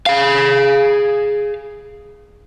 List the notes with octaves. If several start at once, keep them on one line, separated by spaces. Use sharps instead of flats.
G#4 F5